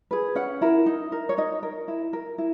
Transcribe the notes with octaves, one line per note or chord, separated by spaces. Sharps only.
G#4 B4
C#4 F#5
E4 A#4
D#4
A#4
C#5
D#4 D#5
A#4
E4
A#4
E4